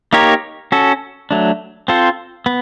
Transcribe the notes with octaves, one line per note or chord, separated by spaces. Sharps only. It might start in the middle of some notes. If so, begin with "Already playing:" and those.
A#3 D#4 G4 A#4 C#5
C#4 F#4 A4
F#3 A3 D4
C4 F4 A4 C5
B3